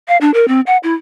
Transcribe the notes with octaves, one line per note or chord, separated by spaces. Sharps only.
F5
D4
A#4
C4
F#5
E4